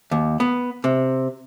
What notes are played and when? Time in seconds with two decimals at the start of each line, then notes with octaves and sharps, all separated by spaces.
0.11 D#2
0.40 B3
0.84 C3